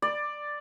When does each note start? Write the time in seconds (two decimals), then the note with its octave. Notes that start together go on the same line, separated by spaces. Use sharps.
0.02 D5